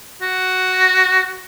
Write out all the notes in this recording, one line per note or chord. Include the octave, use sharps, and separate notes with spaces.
F#4